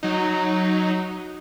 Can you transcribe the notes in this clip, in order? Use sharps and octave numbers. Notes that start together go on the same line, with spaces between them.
F#3 D#4